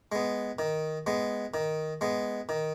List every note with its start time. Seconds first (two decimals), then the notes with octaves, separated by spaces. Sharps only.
0.12 G#3 B3
0.59 D#3
1.07 G#3 B3
1.54 D#3
2.01 G#3 B3
2.49 D#3